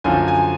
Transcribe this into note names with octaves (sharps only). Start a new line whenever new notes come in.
F#2 D3 F3 G#5
G#5